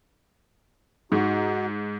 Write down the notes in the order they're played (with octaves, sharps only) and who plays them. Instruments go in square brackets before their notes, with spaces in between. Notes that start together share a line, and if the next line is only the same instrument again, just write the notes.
[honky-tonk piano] G#2 [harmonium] D#4 F#4